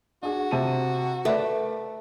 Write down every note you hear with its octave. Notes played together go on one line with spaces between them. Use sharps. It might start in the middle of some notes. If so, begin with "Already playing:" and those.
D4 F#4 G#4
C3 A5 D#7
A3 A#4 B4 D5